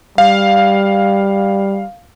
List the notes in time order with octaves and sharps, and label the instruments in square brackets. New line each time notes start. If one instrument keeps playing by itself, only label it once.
[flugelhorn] G3 [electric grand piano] F5